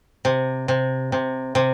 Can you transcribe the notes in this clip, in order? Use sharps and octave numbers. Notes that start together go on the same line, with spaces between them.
C3
C3
C3
C3